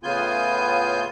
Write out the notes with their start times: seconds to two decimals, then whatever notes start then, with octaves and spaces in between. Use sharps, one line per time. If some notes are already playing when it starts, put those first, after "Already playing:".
0.03 A2 C#3 B3 F4 G#5 G6